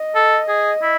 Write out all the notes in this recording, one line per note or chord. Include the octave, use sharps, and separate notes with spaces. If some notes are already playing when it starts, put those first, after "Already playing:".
Already playing: D#5
A4
G#4
E4